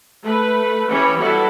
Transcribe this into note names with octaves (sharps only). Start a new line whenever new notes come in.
A3 B4
E3 C#4 G4 C#5 B5
G3 B3 E4 F#4 A4